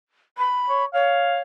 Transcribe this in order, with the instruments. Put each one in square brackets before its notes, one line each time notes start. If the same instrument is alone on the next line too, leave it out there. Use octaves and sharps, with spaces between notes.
[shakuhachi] B5
[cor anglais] C#5
[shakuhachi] C#5 [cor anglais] F5